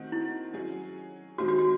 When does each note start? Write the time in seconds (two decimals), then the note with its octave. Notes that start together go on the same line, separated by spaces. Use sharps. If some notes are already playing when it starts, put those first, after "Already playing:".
Already playing: D#3 A3 C4 D#4 F#4
0.12 E4
0.53 F#3 C#4 G#4
1.38 D#3 G#3 C4 F#4
1.48 F#4
1.58 F#4